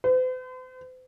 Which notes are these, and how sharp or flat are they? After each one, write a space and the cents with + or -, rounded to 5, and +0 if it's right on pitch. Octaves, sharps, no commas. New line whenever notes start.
C5 -45